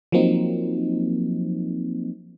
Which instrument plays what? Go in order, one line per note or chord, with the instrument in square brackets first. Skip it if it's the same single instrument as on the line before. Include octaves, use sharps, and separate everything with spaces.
[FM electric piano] F3 F#3 A#3 C4 D#4